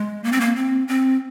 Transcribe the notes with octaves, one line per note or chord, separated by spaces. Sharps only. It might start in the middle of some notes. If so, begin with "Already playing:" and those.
Already playing: G#3
A#3
C4
A#3
C4
C4